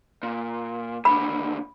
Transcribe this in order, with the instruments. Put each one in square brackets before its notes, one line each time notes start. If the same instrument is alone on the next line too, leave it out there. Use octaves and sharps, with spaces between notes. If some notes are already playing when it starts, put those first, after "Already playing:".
[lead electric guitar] A#2
[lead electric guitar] D#2 D3 [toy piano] B5